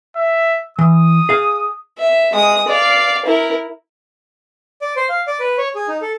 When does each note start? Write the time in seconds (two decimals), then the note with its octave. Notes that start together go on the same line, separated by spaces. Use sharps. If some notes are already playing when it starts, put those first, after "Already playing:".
0.16 E5
0.79 E3 D#6
1.29 G#4 F5
1.98 E5
2.32 G#3 D#6
2.68 D5 F5
3.25 E4 A#4
4.82 D5
4.97 C5
5.09 F5
5.27 D5
5.40 B4
5.58 C#5
5.75 G#4
5.88 D#4
6.02 A4